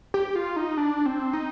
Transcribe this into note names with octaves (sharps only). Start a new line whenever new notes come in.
G4
F4
D#4
D4
C4
D#4